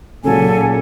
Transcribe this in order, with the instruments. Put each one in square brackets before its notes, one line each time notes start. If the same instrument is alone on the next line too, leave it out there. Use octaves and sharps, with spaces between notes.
[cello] A#2 [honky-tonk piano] C#3 F#3 [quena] A4 [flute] G#5